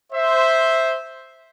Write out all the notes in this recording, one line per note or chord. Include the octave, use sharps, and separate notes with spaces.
C5 E5